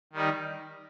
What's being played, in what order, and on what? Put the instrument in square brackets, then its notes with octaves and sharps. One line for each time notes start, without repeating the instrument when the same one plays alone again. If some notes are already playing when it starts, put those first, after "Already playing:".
[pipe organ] D#3 G3 D#4